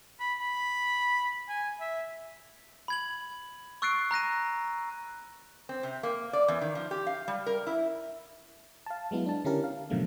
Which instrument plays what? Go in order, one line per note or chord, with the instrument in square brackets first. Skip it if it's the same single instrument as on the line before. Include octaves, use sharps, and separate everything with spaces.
[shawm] B5
B5
G#5
E5
[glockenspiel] B5 G#6 F#7
C#6 E6 F#6 A6 C7 D7
A#5 F#6 A#6 D#7
[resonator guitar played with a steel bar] C4
C3
A#3
D5
E2
D#3
F3
G4
F5
G3
A#4
E4
[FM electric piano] F5 A5
F#3 G#3 B3 E4
D4 A5
D3 C#4 E4 G4 A#4 A5
F5
G#2 B2 D3 F3 F#3 A3